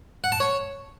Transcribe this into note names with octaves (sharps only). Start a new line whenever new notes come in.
F#5
A5
C#5